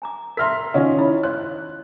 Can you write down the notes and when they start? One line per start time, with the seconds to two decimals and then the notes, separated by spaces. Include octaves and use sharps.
0.02 G#5 A#5 D6
0.37 A#4 E5 A#5 C6 F6 B6
0.74 D#3 C#4 F4 D#5 F5 F#5
0.98 E4 B5
1.23 C#5 D#5 C6 F#6